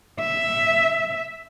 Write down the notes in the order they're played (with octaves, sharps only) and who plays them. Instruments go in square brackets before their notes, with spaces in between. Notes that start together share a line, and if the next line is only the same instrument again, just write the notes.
[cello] E5